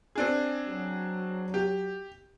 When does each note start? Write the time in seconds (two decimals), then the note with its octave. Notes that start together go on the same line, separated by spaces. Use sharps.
0.15 C4 D4 G#4
0.68 F#3
1.54 G4